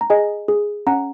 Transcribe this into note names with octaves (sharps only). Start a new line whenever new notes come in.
A#5
G#4 D#5 G#5
G#4
C#4 F#5 A#5